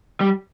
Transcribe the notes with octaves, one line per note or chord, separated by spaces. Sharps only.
G3